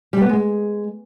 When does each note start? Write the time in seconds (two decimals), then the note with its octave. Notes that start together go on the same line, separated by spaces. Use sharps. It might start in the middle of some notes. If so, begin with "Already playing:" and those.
0.13 G3
0.21 B3
0.29 G#3